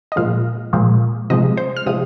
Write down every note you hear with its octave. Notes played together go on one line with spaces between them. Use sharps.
D#5
A#2 F3 G#3 F5
A#2 F3 G#3
C3 F3 G#3 D#5
C5
F6
C3 F3 G#3 D#6